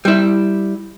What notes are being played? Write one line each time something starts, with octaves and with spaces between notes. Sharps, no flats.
G3 E4